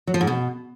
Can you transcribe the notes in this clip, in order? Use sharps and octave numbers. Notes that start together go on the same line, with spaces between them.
F#3
F3
G#2
B2